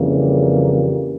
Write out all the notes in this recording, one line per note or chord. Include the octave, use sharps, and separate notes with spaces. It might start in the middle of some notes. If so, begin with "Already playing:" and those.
Already playing: F2 C#3 E3 G3 A#3